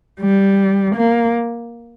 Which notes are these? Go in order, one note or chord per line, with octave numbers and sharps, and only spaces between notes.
G3
A#3